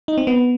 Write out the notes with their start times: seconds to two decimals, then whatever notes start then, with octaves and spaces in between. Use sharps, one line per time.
0.08 D#4
0.18 C4
0.27 B3